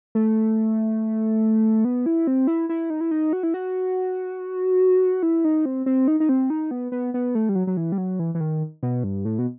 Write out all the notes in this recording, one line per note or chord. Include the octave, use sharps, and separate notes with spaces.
A3
B3
E4
C4
E4
E4
D#4
E4
D#4
F#4
E4
F#4
E4
D#4
C4
C4
D#4
D#4
C4
D#4
B3
B3
B3
A3
G3
F#3
F#3
E3
G3
F#3
E3
E3
D#3
B2
G2
A2
B2